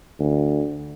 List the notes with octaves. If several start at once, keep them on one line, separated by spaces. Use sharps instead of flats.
D2